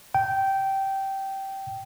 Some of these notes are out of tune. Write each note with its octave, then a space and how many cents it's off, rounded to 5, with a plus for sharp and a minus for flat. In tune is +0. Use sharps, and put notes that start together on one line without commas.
G5 -15